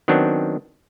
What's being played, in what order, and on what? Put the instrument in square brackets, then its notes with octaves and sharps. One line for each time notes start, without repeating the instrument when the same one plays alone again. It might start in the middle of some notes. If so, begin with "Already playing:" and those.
[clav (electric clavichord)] D#3 F#3 B3 C4 D4